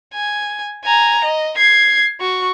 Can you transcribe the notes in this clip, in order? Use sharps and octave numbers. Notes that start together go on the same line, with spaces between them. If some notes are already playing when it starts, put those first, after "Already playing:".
G#5
G#5 A#5
D#5
G#6 C7
F#4 C#6